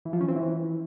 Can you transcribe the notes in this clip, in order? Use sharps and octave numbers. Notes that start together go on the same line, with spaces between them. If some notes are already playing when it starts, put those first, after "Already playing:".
E3
F3
C#4
C4
E3